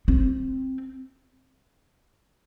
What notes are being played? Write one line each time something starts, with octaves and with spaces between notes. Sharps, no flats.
C4